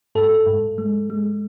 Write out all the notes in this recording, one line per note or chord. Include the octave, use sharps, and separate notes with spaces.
G#2 A4
G#2
G#3
G#3